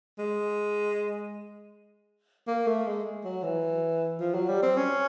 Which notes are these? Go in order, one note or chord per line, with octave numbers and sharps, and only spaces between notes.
G#3
A#3
A3
G#3
F#3
E3
F3
F#3
G3
C4
C#4